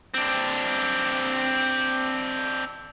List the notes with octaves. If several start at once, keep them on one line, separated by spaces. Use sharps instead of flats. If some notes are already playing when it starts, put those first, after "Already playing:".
C4 D4